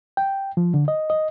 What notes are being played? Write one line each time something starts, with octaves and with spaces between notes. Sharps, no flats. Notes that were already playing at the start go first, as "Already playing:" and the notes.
G5
F3
D3
D#5
D#5